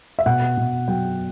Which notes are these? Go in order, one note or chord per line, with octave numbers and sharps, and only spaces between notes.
E5
B2 F#5
B2
F#3 G5